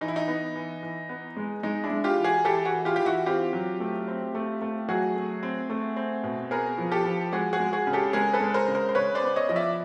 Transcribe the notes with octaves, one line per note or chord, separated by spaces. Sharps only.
E3 D#4
E4
D#4
B3
E3
E3
B3
G#3
G#3 D#4
D4 E4
G#3
F4 G4
E3
F#4 G#4
E3 G4 A4
F#4 G#4
E3
F4 G4
E3 G4
E4 F#4
C4 F4 G4
F#3
A3
C4
A3
A3
F#3 F#4 G#4
A3
C4
A3
C4
B2
B3 G#4 A#4
F3
G4 A4
F3
G#3 F#4 G#4
F#4 G#4
G#3
F#4 G#4
C#3
G4 A4
G#3 G#4 A#4
A4 B4
G#3
A#4 C5
C#3
A#4 C5
C5
C#3 B4 C#5
C5 D5
B3
C#5 D#5
F3 D#5
D5 E5